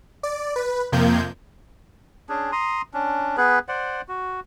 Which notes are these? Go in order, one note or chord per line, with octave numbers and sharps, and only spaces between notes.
D5
B4
F2 C3 F3 A#3 G6 G#6
C#4 D4 G#4
A#5 C6 D#6
C#4 D4
B3 G#4 B4
C5 D5 F#5
F#4